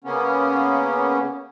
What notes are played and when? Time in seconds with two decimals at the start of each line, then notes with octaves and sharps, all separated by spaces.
0.04 C#3 A#3 B3 C#4